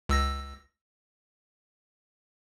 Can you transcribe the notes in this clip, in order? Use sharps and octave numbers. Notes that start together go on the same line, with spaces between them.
C#2 E6 A#6